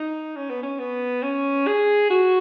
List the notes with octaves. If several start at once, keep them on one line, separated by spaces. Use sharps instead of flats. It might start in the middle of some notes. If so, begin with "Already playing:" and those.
Already playing: D#4
C#4
B3
C#4
B3
C#4
G#4
F#4